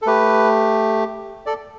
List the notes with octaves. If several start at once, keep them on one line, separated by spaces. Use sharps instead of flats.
A4
A3 G4 B4
A4 D5